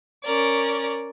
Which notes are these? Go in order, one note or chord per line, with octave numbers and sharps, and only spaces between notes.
C#4 A#4 D5